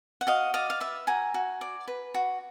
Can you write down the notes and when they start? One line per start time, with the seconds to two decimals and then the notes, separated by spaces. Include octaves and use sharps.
0.21 F#5
0.27 F#4 D#5 F5
0.54 D5 D#5 F5
0.70 F5
0.80 B4 E5
1.07 F#4 G#5 A#5
1.34 F#4
1.61 D5
1.88 B4
2.14 F#4